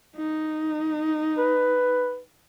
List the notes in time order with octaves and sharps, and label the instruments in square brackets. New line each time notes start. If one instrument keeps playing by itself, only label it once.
[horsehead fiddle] D#4
[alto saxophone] B4